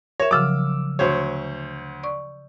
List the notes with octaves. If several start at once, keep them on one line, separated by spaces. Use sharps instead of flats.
A#4 C#5 E5
C#3 F3 F#3 D6 E6 F6
D2 C5 C#5
D5 C#6